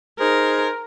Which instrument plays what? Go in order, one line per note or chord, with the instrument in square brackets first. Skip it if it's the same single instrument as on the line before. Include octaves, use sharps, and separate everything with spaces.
[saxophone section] D#4 G#4 C5 [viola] A#4